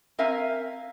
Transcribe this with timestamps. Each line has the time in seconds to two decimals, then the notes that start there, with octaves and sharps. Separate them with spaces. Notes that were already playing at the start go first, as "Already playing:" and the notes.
0.18 C4 A#4 E5 F5 G#5